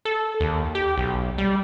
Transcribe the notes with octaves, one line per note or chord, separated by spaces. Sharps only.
A4
D#2
G4
B1
G3